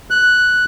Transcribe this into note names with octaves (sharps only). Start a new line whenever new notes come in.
F#6